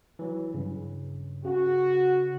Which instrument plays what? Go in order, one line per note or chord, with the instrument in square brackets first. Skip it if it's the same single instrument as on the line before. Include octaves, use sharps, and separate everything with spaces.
[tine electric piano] E3 F#3
G2 C#3
[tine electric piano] C#3 [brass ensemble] F#4